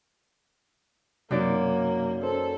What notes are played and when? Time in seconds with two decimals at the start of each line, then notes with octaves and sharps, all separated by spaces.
1.31 F#2 C3 F#3 A#3 D#4 D5
2.22 C#4 A4 C5